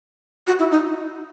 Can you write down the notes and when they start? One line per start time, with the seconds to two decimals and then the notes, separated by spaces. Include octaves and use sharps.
0.47 F#4
0.59 E4
0.71 D#4